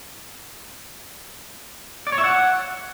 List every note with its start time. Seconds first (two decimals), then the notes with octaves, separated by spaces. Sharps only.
2.07 D5
2.12 C#5
2.18 E5
2.24 F#5